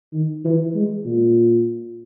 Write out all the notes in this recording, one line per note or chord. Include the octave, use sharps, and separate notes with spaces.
D#3
E3
G#3
A#2